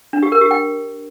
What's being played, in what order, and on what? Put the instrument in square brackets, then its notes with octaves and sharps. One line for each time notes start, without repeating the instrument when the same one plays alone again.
[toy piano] D4
G4
A#4
G4
G5